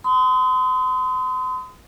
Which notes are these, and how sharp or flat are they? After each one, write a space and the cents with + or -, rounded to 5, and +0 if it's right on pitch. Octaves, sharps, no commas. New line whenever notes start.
C6 -40 D#6 +20